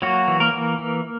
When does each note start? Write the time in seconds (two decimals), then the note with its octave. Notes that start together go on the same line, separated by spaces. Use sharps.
0.02 F#3 A#3 F#4
0.28 E3
0.40 A#3 A#4
0.53 E3
0.78 E3